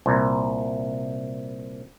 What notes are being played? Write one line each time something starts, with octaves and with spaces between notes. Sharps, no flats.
C2 A#2